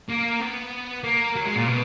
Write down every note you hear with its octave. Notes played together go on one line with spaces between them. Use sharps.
A#3
B3
A#3
F#3
G#3
A#2
B2